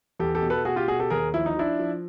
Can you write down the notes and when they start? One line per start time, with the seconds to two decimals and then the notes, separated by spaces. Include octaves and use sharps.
0.20 E2 G4 A4
0.35 G4 A4
0.42 B2
0.50 A4 B4
0.65 B2 F#4 G#4
0.76 F4 G4
0.88 B2 F#4 G#4
1.00 G4 A4
1.10 D#2 G#4 A#4
1.34 F3 E4
1.46 D#4
1.57 F3 D4 E4
1.80 F3